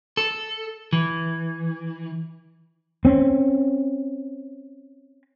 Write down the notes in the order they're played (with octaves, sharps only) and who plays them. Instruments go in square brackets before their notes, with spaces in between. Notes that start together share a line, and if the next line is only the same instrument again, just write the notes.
[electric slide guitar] A4
E3
[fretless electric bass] C4 C#4